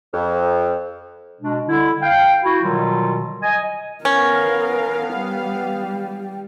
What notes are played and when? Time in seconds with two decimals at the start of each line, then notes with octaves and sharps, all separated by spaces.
0.14 F2
1.41 B2 G#3 D4
1.68 D3 G3 E4
2.02 F5 G5
2.44 E4 F#4
2.63 B2 D3 D#3 F#3 G3 F4
3.42 D#5 G#5
4.05 B3 C#4 A#4 F5
5.16 G3